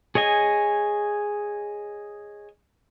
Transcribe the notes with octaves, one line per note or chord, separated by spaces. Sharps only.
G#4 C#5 D#5 G#5